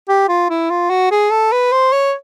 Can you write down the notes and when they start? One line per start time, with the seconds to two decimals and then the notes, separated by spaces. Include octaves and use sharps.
0.09 G4
0.28 F4
0.49 E4
0.70 F4
0.90 F#4
1.11 G#4
1.31 A4
1.52 B4
1.72 C5
1.92 C#5